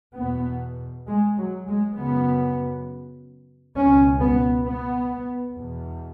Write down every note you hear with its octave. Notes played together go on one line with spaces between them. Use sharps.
E2 B2 B3
G#3
F#3
G#3
F#2 C#3 B3
C#2 B2 C#4
B3
B3
E2 B2